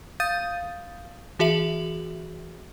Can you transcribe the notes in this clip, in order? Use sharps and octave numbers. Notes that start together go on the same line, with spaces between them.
F5 D#6 G6 A6 D#7
E3 F#4 G#4 E5 F#7